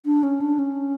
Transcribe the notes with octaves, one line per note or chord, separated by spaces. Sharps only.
D4
C#4
D4
C#4